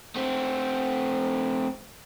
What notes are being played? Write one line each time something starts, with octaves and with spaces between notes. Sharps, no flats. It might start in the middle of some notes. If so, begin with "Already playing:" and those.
A3 C4